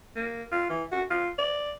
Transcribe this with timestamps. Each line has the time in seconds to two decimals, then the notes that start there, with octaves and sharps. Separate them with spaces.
0.16 A#3
0.52 F4
0.70 E3
0.92 F#4
1.10 F4
1.38 D5